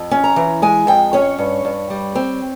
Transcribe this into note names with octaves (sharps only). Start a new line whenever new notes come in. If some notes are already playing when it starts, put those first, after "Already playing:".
Already playing: F2
C#4
A#5
E3
G#3 G#5
F2 G5
C#4 C#5
G2
G2
G3
C4